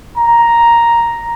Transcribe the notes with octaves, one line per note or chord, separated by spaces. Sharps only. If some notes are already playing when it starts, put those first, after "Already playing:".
A#5